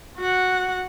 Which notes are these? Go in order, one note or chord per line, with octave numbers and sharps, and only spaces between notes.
F#4 F#5